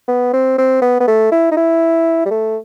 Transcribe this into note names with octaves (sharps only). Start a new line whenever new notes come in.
B3
C4
C4
B3
B3
A3
E4
D#4
E4
G3
A3